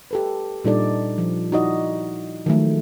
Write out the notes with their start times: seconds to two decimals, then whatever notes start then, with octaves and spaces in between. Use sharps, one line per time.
0.11 G4 A4 B4
0.64 A#2 G3 D4 D#4 A4 D5
1.18 F3
1.52 D#4 E4 F#4 D5 D#5
2.46 D#3 F3 F#3 G#3 A3